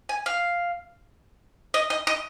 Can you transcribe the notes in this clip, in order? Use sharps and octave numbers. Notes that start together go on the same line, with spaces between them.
G#5
F5
D#5
D#5
D#5